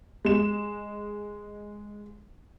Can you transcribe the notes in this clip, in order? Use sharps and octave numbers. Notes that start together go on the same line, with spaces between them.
G#3 E7